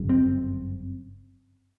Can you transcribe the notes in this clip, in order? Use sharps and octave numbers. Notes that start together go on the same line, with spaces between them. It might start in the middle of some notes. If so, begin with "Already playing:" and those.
Already playing: G1 F#2 C#3
C4